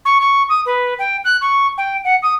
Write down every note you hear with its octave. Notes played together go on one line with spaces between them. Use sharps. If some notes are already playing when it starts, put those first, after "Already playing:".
C#6
C#6
D#6
B4
G5
F#6
C#6
G5
F#5
D#6